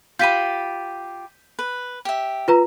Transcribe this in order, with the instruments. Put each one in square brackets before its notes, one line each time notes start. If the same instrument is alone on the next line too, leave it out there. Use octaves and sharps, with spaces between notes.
[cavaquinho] F4 G4 B5 [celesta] G6 B6 D#7
[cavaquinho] B4
G4 E5
[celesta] F4 B4 A#5